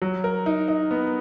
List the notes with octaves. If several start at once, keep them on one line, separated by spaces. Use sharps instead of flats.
F#3
A#4
D#4
D#4
B3